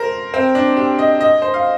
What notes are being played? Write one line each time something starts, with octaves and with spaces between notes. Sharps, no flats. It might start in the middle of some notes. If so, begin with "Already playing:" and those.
Already playing: A#4 C5
C4
D4
G4
D#5
D#5
C5
F5